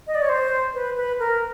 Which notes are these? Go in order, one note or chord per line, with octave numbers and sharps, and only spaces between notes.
D#5
D5
C#5
C5
B4
B4
A#4